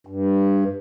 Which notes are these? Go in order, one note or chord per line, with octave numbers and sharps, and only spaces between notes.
G2